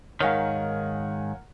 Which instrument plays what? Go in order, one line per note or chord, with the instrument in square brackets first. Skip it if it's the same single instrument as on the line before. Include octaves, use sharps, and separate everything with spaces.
[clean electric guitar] G#2 D#3 [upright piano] A#4 F#5 G#5 [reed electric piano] C#5 F5